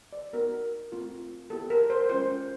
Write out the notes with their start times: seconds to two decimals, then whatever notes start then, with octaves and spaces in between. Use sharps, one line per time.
0.13 D5
0.33 B3 D#4 F#4 A#4
0.92 A3 C4 F4
1.50 B3 E4 G4 A4
1.70 A#4
1.90 C5
2.09 G#3 C#4 F4 C5